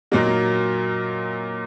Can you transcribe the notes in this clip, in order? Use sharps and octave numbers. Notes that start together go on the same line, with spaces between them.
A#2 F#3 A#3 D#4